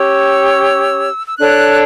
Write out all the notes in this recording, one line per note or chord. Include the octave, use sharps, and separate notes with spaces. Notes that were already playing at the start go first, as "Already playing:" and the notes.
Already playing: C#4 G4 C#5 E6
E6
D4 A4 C#5 F#6